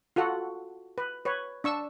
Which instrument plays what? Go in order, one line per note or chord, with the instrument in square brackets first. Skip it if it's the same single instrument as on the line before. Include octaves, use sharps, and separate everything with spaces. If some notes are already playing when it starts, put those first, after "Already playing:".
[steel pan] F4 F#4 A4 F#5
B4
B4 C#5
D4 C#6 E6